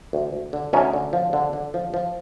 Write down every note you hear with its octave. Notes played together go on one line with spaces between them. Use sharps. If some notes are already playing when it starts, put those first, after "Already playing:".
D2
D2
D3
D2 C#4 D#4
D3
F3
D3
D3
F3
F3